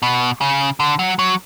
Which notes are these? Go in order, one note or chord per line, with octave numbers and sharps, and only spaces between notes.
B2
C#3
D3
F#3
F#3